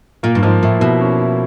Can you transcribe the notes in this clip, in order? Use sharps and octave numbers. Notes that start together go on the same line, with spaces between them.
A#2 A#3
G2
G#2 F3
A2 E4
B2 E4
C#4
E4